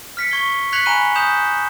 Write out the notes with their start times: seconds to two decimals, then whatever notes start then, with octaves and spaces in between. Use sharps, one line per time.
0.17 F6 B6 C#7
0.31 C#6 G#6 B6 G7
0.73 F#6 G#6 B6 C#7 F7 F#7
0.86 G#5 A#5 B5 F#6 D#7 G7
1.15 D#6 G6 E7 F7